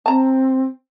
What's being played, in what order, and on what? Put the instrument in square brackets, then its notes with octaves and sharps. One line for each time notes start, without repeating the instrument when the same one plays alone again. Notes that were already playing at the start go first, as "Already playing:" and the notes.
[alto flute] C4 [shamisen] A5 A#5